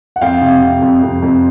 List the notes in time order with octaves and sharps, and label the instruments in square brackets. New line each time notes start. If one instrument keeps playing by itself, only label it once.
[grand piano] F#5
F2 F5 G5
C3
C3
F2
F2
F2